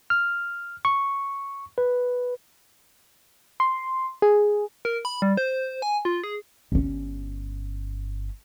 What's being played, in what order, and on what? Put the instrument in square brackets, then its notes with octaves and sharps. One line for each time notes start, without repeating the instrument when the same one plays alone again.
[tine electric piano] F6
C#6
B4
[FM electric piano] C6
G#4
[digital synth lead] A#4
B5
G3
C5
G#5
F4
G#4
[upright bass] G1 C#4